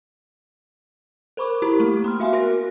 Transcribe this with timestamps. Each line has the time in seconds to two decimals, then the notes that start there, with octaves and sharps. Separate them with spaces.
1.37 A#4 C5 B5 C#6 D6
1.62 E4 G4 A#4 A#5 B5 C#6
1.80 A3 A#3
2.04 B3 C6 F6
2.20 F#4 E5 F5 G#5 C6
2.33 F#4 A#4 C6 A#6